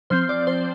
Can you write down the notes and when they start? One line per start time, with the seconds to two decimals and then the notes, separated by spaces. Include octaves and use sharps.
0.10 F3 C4 C5
0.29 D5
0.47 C5